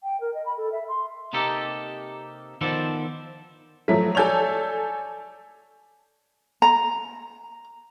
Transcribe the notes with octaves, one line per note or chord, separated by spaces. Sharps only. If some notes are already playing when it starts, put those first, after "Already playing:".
G5
A#4
D#5
B5
A4
E5
C6
C3 A#3 D#4 G4 A4
D#3 F3 B3 A4 C5 D5
F3 F#3 A3 B6
A4 C#5 D5 G#5 G6 F7
A#5